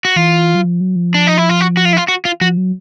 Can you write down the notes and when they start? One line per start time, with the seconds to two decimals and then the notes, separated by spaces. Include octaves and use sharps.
0.05 F#4
0.16 E3 F4
0.55 F#3
0.64 F3
0.81 F#3
0.96 F3
1.14 D4
1.27 D#4
1.38 E4
1.49 F4
1.61 F#4
1.77 F#4
1.85 F4
1.93 E4
1.97 F4
2.08 F#4
2.25 F4
2.41 F3 F#4
2.57 F#3